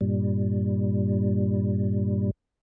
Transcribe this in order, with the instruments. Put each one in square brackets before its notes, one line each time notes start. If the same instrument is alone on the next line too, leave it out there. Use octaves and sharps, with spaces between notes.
[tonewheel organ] G2 A#2 G3